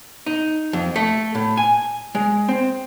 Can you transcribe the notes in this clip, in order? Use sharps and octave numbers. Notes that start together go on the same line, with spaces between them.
D#4
F2
A3
A2
G#5
G#3
C4